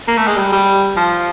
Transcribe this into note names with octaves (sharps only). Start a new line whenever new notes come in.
A#3
A3
G#3
G3
G3
F3